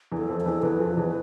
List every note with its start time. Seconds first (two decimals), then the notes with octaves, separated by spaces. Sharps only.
0.12 E2 E3
0.17 A4
0.29 F2 F3
0.40 A4
0.46 E2 E3
0.62 E2 E3 B4
0.80 F2 F3
0.97 E2 E3